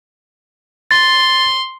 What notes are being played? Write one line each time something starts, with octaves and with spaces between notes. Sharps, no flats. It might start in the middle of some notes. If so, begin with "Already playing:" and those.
C6 A6